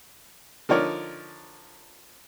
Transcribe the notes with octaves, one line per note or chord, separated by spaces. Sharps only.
D3 F3 D#4 A#4 C#5 D5